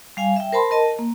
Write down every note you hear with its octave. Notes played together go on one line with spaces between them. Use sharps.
G3 F5 G#5
E5 G5
A#4 C5 A5 B5 C6
A#4 D#5 A5
A#3